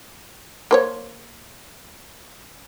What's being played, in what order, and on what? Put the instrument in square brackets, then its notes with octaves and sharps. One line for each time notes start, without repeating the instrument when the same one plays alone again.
[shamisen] A#3 C5 C#5